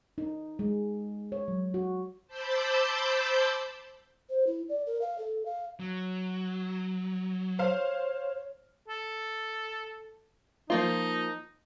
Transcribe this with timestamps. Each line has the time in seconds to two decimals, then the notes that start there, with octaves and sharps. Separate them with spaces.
0.18 D#4
0.59 G#3
1.32 C#5
1.48 F#3
1.74 F#4
2.27 C5 A5 B5 D6 E6 G6
4.30 C5
4.47 E4
4.69 D5
4.87 A#4
5.01 F5
5.19 A4
5.46 F5
5.80 F#3
7.59 C5 C#5 F5
8.88 A4
10.70 F3 A#3 D#4 F4